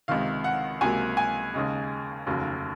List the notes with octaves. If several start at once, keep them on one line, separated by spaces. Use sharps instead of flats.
C#2 C3 D#3 F5
F#5
C#2 C3 F#3 A#3 G#5
G#5
D#2 C#3 G#3
F1 D#2 C#3 F#3